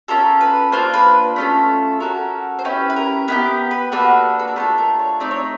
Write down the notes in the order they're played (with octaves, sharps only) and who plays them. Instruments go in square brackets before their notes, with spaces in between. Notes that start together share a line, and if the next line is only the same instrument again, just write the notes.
[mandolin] C#4 F4 A4 A#4
B4
A#3 D4 F4 C5
B4
A3 C#4 F4 A4
C#4 F#4 A4 A#4
C5
C#4 E4 G4 B4
B4
A#4
B3 E4 G4 A#4
B4
A#3 D4 F#4 A4 B4
A4
A#4
A3 D4 F4 A4 B4
A#4
C#5
A3 C4 D#4 D5
C#5